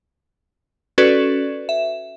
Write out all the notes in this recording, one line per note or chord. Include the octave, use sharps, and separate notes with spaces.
C#4 F#4 A4 B4 D5
E5